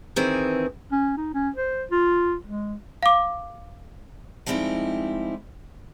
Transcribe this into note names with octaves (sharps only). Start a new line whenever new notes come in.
D#3 E3 C4 G#4
C#4
D#4
C#4
C5
F4
G#3
F5 D6
F3 G3 G#3 C4 D#4 E4